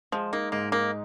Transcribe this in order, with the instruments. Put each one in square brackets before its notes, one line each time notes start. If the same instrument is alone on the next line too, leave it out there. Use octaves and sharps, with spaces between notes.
[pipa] F3 [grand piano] G#3
[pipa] A#3 [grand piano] D#4
[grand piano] G#2 [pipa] A#3
[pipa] A#3 [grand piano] D#4